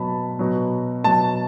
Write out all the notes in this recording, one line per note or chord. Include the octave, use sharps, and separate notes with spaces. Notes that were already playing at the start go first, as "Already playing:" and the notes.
Already playing: B2 F#3 A5 B5
B2 F#3
B2 F#3 A5